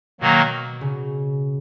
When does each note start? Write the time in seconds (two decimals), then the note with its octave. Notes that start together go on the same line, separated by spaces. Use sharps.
0.21 B2 D#3 F#3 A#3
0.81 C#3